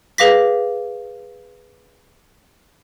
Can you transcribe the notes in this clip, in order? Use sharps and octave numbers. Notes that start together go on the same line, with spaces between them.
G#4 B4 F5 D6 A#6 B6